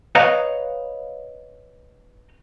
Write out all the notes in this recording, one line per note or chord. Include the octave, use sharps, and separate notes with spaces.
B4 C#5 D#5 F5 A#5